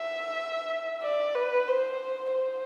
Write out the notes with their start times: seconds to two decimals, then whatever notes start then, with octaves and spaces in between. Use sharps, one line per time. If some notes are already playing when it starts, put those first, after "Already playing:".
Already playing: E5
1.03 D5
1.35 B4
1.68 C5
2.33 C5